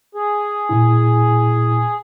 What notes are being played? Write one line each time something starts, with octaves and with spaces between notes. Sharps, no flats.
G#4
A#2 E4